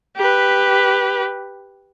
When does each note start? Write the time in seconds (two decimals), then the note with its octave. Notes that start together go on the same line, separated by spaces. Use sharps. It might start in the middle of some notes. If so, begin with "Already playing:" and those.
0.16 G4 B4